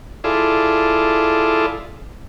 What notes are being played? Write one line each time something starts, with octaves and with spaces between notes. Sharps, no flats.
E4 F4 G#4 A4 D5